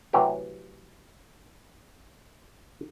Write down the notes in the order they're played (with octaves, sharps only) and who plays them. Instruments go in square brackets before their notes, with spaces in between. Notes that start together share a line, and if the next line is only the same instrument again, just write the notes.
[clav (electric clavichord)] C3 E3 F#3 A3 G4